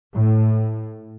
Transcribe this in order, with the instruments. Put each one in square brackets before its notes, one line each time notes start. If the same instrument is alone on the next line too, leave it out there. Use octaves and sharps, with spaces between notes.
[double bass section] A2